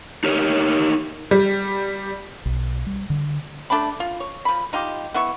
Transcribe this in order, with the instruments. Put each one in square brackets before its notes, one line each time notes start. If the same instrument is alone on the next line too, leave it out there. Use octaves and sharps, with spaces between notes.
[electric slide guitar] D#4 G4 A#4 C#5
[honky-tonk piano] G3
[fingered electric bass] B1
G3
D3
[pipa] A3 D4 A5 B5
F4
C#5
F3 B5
D#4 F4 G4
B3 E4 C#6